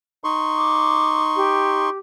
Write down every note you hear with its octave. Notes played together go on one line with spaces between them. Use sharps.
D#4 C6 C#6
D6
G4